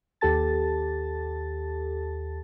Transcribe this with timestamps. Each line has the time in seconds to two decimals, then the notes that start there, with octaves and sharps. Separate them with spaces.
0.21 D#2 G4 A4 A5 A6